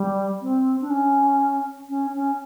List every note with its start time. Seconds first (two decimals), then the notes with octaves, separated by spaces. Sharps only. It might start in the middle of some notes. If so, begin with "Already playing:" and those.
Already playing: G3
0.41 C4
0.81 D4
0.90 C#4
1.89 C#4
2.14 C#4